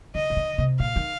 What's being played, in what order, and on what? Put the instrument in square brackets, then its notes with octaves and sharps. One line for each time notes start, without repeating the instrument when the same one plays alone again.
[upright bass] D3 [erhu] D#5
[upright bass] C3
D3
C3
[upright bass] A#2 [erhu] F5
[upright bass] D#3